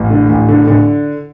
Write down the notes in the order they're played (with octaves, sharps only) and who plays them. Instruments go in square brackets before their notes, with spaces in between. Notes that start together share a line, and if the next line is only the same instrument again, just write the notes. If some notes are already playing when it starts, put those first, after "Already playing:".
Already playing: [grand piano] A1
D3
A1
D3
D3